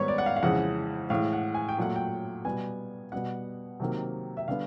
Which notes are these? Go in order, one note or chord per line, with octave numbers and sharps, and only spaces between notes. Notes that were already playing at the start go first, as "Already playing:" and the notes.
Already playing: G#2 D#3 G3 B3 B4 C#5
D5
F#5
F5
F5
F2 C#3 E3 G#3 F#5
A2 E3 G#3 F5
F#5
G#5
G5
A#2 F#3 A3 F#5
G5
B2 G3 B3 G#5
B2 G3 B3 F#5
C3 D#3 F#3 A#3
E5
D3 G3 B3 F5